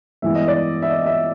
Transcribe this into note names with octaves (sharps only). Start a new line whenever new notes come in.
G2 E3 G#3 B3 E5
D#5
D5
E5
D#5
D#5
E5